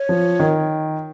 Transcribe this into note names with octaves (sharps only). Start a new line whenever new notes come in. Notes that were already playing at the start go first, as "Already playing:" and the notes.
Already playing: C#5
F3
D#3